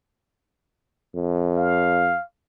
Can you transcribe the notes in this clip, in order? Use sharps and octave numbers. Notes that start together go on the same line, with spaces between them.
F2
F5